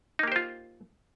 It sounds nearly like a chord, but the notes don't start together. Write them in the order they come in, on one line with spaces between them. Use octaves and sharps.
D#4 A#3 G4 C5 F4